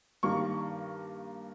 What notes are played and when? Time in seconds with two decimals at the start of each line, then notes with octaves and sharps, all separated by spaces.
0.23 G2 D#3 G3 A#3 C#6